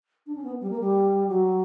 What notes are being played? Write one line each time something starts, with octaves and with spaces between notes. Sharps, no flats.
D4
C#4
B3
G3
A#3
G3
F#3